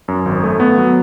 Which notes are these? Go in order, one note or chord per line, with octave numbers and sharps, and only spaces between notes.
F#2
G#1
A3
B3
F#3